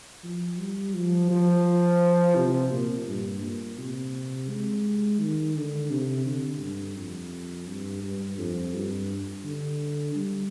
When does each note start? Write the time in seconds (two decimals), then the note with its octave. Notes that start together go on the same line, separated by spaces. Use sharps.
0.24 F3
0.60 G3
0.95 F3
1.31 F3
2.36 C3
2.72 A#2
3.07 G2
3.43 A#2
3.78 C3
4.49 G#3
5.20 D#3
5.56 D3
5.91 C3
6.26 D3
6.61 G2
6.97 F2
7.68 G2
8.04 G2
8.38 F2
8.74 G2
9.44 D3
10.16 G3